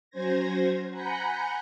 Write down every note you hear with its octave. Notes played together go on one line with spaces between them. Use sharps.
F#3 C#4 C5 G#6 A#6
F#5 G#5 A#5 B5 G6 C#7